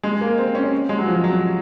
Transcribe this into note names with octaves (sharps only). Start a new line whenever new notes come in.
G#3
A#3
C4
C#4
G#3
F#3
F3
F#3